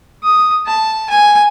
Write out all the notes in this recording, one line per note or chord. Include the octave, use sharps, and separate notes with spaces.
D#6
A5
G#5